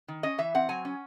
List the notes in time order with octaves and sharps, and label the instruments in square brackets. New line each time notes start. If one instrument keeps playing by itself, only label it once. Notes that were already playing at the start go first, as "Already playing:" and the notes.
[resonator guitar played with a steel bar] D#3
C#4 D#5
E3 E5
C4 F#5
F#3 G#5
C#4